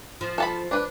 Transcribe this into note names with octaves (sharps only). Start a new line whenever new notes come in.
F3
A4 A5 B5
D4 B4